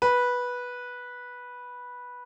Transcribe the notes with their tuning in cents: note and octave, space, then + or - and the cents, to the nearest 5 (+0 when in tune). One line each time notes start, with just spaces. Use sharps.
B4 -10